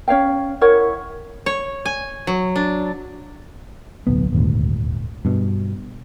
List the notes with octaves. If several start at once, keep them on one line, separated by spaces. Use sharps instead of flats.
C#4 C#5 F5 G5
E4 A#4 C#5 F#5
C#5
G#5
F#3
D4
D1 B1 B3
D#1 G#1 D2
G2 B2